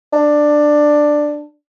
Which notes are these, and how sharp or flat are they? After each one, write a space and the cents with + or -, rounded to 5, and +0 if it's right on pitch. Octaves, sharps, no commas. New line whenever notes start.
D4 +10